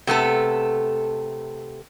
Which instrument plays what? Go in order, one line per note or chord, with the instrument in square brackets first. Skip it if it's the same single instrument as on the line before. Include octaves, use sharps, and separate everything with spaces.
[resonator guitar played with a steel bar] C3 A3 B3 A4